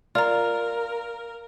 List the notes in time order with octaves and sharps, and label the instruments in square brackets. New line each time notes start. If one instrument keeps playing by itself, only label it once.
[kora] F4 [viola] A#4 [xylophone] D5 A#5